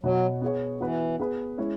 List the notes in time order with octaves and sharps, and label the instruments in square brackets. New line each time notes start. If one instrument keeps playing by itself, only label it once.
[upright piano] B2 B3 F#4 C#5 [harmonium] F#3
[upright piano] B3 G#4 C#5
[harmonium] E3 [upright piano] B3 F#4 B4
[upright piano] B3 G#4 B4
G#3 C#4 E4 C#5